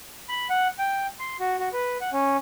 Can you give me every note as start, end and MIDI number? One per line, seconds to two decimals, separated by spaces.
0.29 0.47 83
0.50 0.68 78
0.79 1.07 79
1.19 1.37 84
1.40 1.56 66
1.59 1.69 66
1.73 1.97 71
2.01 2.10 78
2.13 2.37 61